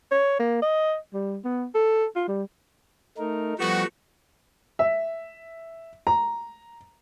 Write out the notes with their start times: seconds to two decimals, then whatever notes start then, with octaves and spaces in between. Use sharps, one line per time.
0.11 C#5
0.39 A#3
0.62 D#5
1.14 G3
1.44 B3
1.75 A4
2.16 F4
2.28 G3
3.18 A3 D#4 A#4
3.59 F3 G3 A3 B3 F#4
4.79 E5
6.07 A#5